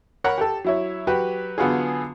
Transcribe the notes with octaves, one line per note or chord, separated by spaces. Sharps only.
A#4 C#5 F#5 A#5 B5
G4 A4
F#3 E4 C#5
F#3 F#4 G4 B4
D3 F#3 B3 F4 F#4 G#4